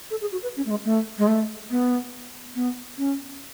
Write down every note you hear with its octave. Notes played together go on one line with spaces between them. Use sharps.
A4
G#4
F#4
B4
C#4
A3
G#3
A3
G#3
A3
B3
B3
C#4